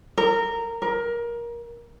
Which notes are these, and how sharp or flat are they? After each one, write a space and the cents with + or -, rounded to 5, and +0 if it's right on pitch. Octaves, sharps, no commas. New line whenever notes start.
A#4 -15
A#4 +20